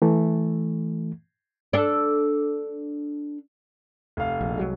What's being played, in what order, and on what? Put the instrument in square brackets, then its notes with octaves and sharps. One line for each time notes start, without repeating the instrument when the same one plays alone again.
[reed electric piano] E3 A3
[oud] D4 A4
[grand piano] F1 F5
[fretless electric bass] A#1
C2 F#3 G#3